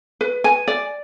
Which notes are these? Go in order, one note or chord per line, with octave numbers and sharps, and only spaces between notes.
B4
G#5
D5